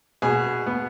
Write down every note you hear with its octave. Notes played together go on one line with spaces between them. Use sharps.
B2 G#4
B3